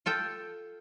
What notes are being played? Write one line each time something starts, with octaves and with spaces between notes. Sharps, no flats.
F4 A4 G5